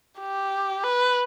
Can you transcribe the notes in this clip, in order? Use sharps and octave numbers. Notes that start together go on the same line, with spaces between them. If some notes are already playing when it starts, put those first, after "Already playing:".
G4
B4